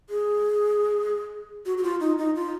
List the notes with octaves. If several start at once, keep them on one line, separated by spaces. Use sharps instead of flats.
G#4
F#4
F#4
F4
D#4
D#4
F4